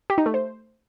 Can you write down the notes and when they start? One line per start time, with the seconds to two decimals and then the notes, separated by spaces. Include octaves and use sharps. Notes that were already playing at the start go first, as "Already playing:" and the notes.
0.10 G4
0.18 D#4
0.26 A3
0.34 C5